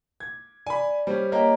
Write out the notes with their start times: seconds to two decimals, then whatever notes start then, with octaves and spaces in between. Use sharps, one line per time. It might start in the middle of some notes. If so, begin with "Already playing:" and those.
0.20 G#6
0.67 D5 G#5 B5
1.07 G3 C#4 C5
1.32 A#3 G4 C#5 D#5 A#5